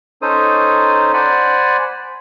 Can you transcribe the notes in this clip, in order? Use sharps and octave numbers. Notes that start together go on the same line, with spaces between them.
C#4 D#4 A4 C5 D#6
C5 D5 F#5 G#5 B5